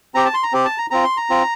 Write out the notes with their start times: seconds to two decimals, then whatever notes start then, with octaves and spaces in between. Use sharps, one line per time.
0.15 C4 G4 A#5
0.25 A5
0.34 C6
0.43 A#5
0.53 C4 G4
0.65 A5
0.78 A#5
0.90 C4 F4 A#5
1.04 C6
1.17 A#5
1.30 C4 F4